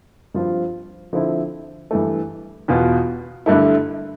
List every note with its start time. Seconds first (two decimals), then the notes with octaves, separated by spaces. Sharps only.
0.34 G2 F3 C4 F4
1.13 D3 F3 C4 E4
1.91 G2 E3 A3
2.68 E2 B2 B3 F4
3.46 G2 D3 A3 E4